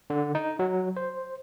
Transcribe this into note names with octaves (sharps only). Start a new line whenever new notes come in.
D3
D#4
F#3
C5